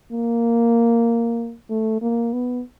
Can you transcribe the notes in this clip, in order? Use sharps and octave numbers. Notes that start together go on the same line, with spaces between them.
A#3
A3
A#3
B3